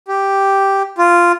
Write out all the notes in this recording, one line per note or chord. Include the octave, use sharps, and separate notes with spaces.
G4
F4